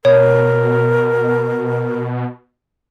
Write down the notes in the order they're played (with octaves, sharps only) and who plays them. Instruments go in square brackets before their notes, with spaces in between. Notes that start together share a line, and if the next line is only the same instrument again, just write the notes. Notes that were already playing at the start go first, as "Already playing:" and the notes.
[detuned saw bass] B2 [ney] A#4 [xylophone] C#5